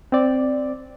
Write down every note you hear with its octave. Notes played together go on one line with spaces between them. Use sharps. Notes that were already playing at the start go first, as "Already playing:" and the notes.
C4 D5